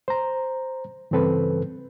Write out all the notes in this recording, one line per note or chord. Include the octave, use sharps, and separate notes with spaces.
C5 A#5
G2 C#3 E3 C4 A4 B4